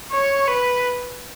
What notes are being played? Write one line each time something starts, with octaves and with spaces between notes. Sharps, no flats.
C#5
B4